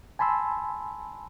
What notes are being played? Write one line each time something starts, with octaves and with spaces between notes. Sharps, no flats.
G#5 A5 B5 C6 E6